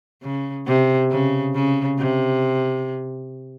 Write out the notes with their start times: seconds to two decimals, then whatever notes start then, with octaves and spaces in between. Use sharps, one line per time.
0.23 C#3
0.67 C3
1.11 C#3
1.55 C#3
1.99 C3